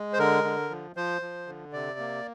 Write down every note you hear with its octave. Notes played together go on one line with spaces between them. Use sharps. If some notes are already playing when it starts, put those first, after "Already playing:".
Already playing: G#3
C5
D3 A#4
D3
F3
F3 C5
F3
D3
C3 D5
A#3